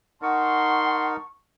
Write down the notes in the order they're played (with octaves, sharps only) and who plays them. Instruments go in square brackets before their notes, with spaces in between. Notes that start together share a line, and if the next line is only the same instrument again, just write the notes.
[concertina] D#4 A#4 [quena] F#5 [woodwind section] A5 C#6 [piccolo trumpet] C6